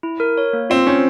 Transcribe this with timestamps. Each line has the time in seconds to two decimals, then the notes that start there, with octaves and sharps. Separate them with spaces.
0.03 E4
0.20 A#4
0.38 C#5
0.53 A#3
0.70 C4 F4
0.87 C#4 C5